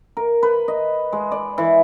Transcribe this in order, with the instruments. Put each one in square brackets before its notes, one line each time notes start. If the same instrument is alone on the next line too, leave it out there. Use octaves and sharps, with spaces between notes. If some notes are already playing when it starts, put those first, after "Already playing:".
[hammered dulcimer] A#4
B4
D#5
G#3
D5
E3